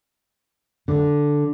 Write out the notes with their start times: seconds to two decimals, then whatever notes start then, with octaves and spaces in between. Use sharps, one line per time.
0.88 D3